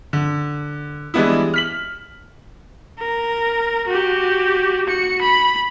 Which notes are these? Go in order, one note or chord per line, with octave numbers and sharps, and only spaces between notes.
D3
E3 G3 G#3 B3 D4 E4
F6 B6 F#7
A#4
F#4 G4
F#4 C#7
B5